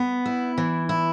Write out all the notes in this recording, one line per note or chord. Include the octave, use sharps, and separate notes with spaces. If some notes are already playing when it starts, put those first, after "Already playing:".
Already playing: B3
E4
E3
E4